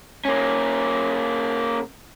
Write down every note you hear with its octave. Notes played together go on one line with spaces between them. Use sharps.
A#3 C#4